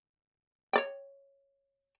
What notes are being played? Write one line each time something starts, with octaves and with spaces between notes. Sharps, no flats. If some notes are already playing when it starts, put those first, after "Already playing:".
C#5 D5 G5